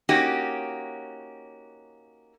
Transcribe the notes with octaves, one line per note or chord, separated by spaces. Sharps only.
A#3 C#4 D#4 F#4 G4